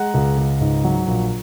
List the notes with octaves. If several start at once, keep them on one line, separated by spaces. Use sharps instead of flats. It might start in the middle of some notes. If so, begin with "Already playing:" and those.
Already playing: G#3 F#5 A#5
C#2
C#2
G#2
F#3
A#1